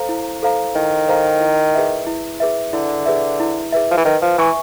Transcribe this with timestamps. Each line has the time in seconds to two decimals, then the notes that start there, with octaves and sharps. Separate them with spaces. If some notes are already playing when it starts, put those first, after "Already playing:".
Already playing: A4 C5 F5 A#5
0.09 E4
0.43 A4 C5 F5 A#5
0.75 D#3 E4
1.08 A4 C5 F5 A#5
1.41 E4
1.74 G#4 B4 E5
2.07 E4
2.40 G#4 B4 E5
2.73 D3 E4
3.06 G#4 B4 E5
3.40 E4
3.72 G#4 B4 E5
3.91 F3
3.98 E3
4.05 D#3 B4
4.22 F3
4.38 E3 E5 G#5 C#6